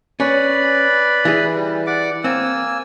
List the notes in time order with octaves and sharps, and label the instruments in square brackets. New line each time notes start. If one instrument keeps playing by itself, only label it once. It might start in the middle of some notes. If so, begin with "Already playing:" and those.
[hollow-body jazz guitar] C#4 [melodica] B4 D5 B5
[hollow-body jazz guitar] E3 G#4
[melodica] G3
D5 F#5 D6
[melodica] A#3 G#5 E6 [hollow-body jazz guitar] C4